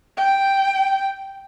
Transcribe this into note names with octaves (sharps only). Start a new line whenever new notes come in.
G5